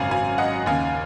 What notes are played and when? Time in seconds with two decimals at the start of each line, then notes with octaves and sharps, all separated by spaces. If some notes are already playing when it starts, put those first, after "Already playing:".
Already playing: G#1 F#2 C#3 F5 G#5
0.11 F5 G#5
0.38 D#5 F#5
0.66 D#2 C#3 F5 G#5